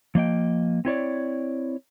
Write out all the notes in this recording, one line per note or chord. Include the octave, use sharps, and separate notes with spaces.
F3 A#3 D#5 G5
C4 E4 C#5 D5